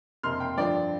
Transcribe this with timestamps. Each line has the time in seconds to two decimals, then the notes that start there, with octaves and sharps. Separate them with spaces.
0.23 F2 C3 A#3 C6 F6
0.40 G5 C6
0.57 G2 D3 F3 D4 D5 G5